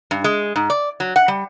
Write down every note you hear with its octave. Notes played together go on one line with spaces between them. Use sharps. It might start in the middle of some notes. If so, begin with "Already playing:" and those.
G2
G#3
G#2
D5
F#3
F#5
G3